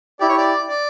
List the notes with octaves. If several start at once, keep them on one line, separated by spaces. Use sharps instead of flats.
E4 G4 D5
C#5
D5
D5